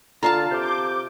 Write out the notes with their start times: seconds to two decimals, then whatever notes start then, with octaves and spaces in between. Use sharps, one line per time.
0.23 D3 F4 F5 A5 A#5
0.51 C3 D6 G6